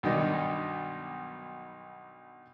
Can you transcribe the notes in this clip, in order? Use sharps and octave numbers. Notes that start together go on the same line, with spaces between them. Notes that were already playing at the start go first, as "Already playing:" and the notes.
B1 G2 D#3 D4 D#4 D#5